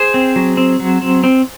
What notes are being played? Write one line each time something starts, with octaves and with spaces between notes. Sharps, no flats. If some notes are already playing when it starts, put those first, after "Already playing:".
Already playing: G#4 C5
C4
F#3
C4
F#3
C4
C4